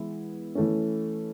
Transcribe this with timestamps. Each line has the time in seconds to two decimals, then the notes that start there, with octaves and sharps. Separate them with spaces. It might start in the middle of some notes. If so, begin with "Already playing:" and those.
Already playing: E3 G#3 B3 E4
0.55 E3 A3 C#4